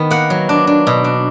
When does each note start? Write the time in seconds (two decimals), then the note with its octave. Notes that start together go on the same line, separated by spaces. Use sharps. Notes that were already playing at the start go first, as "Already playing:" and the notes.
Already playing: D#3 B3
0.11 A#3 F#5
0.30 F#3
0.49 D4
0.67 D4
0.87 B2
1.04 D4